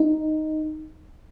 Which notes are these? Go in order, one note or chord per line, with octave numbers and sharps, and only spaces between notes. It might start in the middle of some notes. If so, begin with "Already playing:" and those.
Already playing: D#4